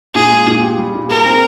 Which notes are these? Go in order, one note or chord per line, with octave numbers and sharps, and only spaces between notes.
A#2 G#4
G#3
A#2
G4
G3
A#2
G#4 A#4
C4